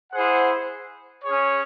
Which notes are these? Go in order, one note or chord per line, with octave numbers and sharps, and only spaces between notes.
E4 G#4 C5 F#5
C#4 G#4 C#5